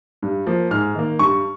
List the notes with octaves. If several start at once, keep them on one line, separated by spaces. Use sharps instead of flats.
G2
F3 A#3
G#2 F6
D#3 A#3
G2 C#6